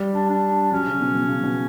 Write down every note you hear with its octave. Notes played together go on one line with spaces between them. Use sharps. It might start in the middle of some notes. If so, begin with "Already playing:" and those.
Already playing: G3
D4
D4
F#3 C#4
C#3
B2
B2
C#3
B2